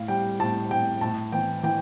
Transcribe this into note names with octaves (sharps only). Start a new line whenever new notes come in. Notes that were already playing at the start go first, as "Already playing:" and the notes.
Already playing: A2 F5
G3 G5
A2 A5
A2 G5
A2 A5
E3 G5
E3 G5